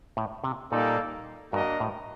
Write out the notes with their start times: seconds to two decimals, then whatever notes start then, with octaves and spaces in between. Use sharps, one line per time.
0.17 A2
0.44 C3
0.71 A#2 G3 A#3 D#4 A4 D5
1.52 G2 A#3 D4 F#4 A#4 D#5
1.80 A2